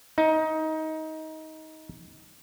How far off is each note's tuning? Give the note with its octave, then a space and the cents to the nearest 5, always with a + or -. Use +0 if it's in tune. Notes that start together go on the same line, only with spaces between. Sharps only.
D#4 +20